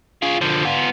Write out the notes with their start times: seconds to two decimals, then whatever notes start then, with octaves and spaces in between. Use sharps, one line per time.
0.22 F4 G#4
0.41 D3 F3
0.65 B3 F4